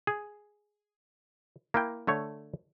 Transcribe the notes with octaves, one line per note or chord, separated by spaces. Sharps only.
G#4
A#3 E4 G5
D3 A3 C#5